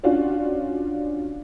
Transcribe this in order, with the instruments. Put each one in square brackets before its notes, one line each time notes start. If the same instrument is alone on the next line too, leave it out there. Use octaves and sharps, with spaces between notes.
[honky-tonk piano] C#4 D4 F4 F#4